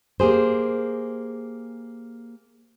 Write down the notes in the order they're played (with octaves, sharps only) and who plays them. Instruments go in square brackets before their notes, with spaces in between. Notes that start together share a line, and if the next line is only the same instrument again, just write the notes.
[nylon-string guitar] A#3 G4 G#4 C5